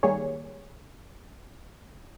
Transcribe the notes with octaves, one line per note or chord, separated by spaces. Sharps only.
D#3 G3 A#3 G#4 C#5